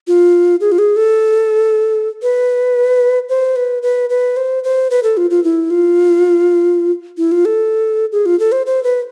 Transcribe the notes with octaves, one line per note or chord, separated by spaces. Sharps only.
F4
G#4
F4
G#4
A4
B4
C5
B4
B4
B4
C5
C5
B4
A4
F4
F4
E4
F4
E4
F4
A4
G#4
F4
A4
C5
C5
B4